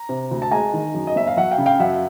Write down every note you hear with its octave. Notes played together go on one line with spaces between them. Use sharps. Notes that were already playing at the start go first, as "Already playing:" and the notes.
Already playing: A#5
C3
D2
A5
G#3 G#5 A#5
D#3
F#2
D#5
G1 E5
F5
F#3 E5 F#5
F5 G5
C#3
F5 G5
F#2 E5 F#5